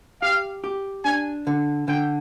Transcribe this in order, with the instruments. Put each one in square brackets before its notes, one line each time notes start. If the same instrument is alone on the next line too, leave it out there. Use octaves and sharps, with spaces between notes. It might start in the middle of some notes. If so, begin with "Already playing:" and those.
[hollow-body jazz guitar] G4 [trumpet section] F5
[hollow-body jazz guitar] G4
[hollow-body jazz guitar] D4 [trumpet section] G#5
[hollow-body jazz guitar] D3
[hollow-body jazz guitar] D3 [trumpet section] G5